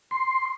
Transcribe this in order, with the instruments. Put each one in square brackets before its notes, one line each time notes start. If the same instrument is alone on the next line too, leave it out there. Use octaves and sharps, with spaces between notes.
[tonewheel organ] C6